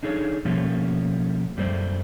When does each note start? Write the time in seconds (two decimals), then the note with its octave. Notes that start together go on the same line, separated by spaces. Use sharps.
0.03 D4 D#4 G#4 A4 C5 C#5
0.45 B2 F3 G3 A3 A#3 C#4
1.57 F#2 G3 A3 C5 D5